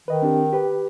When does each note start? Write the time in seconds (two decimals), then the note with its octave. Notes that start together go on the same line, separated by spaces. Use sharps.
0.08 D#3 B4 D#5
0.22 C4 D4 G4
0.53 G4 B4